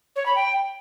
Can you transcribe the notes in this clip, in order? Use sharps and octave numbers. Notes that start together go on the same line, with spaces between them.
C#5
B5
G5